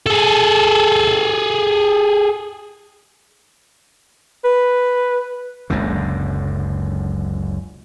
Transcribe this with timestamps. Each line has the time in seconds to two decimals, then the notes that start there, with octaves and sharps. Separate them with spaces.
0.06 G#4 A4
4.44 B4
5.70 F#1 C#2 F#2 D3